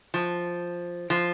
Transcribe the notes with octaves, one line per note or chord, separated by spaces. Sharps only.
F3
F3